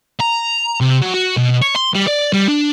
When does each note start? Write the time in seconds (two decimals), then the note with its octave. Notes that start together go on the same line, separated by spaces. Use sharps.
0.20 A#5
0.81 C3
1.01 F#3
1.14 F#4
1.37 B2
1.62 C#5
1.76 C6
1.94 G3
2.07 D5
2.33 G3
2.48 D4